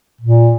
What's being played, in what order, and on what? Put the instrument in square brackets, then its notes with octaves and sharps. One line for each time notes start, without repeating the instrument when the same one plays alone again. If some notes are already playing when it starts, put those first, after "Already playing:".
[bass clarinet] A#2